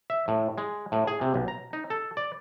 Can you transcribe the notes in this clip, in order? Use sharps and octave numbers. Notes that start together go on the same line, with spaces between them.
E5
A2
G#3
A2
G#4
C3
B1
A#5
D#4
A4
D5